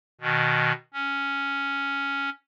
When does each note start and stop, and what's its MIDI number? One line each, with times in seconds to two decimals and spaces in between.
0.21 0.72 47
0.21 0.72 51
0.94 2.30 61